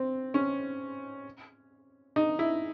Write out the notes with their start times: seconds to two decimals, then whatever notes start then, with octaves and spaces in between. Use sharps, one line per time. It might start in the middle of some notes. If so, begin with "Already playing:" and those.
Already playing: C4
0.34 C#4
2.16 D#4
2.39 E4